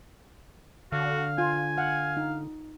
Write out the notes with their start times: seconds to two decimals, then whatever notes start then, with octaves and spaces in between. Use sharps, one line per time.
0.92 D3 F#4 F5
1.38 F4 G#5
1.78 F5 F#5
2.17 D#4